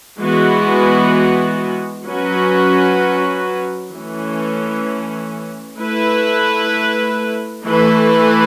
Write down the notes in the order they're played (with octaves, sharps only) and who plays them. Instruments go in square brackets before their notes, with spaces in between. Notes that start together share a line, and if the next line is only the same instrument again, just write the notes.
[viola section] E3 G#3 B3 F#4
F#3 C#4 F#4 B4
E3 A3 C#4
A3 E4 B4
E3 A3 E4 B4